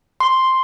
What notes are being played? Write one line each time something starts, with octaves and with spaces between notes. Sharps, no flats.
C6